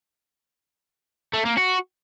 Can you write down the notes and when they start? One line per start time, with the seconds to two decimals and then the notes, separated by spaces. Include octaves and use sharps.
1.34 A3
1.46 A#3
1.57 F#4